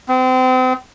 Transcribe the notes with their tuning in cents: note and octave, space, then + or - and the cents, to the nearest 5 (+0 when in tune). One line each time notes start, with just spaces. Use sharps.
C4 -35